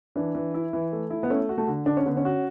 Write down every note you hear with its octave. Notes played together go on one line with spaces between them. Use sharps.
E3 D4
E3
E4
E3
A3
E4
B3
A3 C#4
F#4
A3
D3
D3 D4
C#4
D3 B3
C#4
F#4